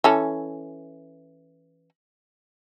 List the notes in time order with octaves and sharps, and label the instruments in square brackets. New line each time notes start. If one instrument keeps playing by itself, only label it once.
[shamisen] E3 C#4 A4